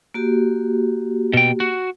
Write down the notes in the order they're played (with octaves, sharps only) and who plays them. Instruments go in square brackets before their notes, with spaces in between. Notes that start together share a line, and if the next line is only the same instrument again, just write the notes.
[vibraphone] A#3 F#4 G4
[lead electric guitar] B2 G5
F#4